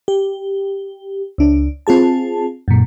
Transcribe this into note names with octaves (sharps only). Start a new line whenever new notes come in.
G4
C#2 D4
C4 F4 G#4 A5
F#2 A#2